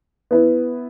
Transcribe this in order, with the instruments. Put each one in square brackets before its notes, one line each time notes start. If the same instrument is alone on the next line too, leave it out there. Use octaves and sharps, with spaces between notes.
[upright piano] B3 E4 B4